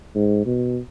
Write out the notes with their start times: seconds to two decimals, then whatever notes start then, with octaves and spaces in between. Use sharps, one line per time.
0.15 G#2
0.46 B2